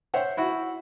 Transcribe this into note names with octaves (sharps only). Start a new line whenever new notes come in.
C5 C#5 E5 F#5 G5
E4 F#4